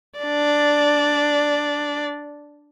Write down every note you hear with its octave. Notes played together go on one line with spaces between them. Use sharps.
D4 D5